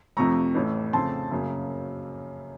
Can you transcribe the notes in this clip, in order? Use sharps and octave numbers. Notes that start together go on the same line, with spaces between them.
F2 C3 F3 A3 A#5 C#6
A1 A2 A3 C#4
F2 C#3 A3 C4 A5 C6
F#2 C#3 F#3 A#3